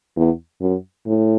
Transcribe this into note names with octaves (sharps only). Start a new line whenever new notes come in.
E2
F#2
A2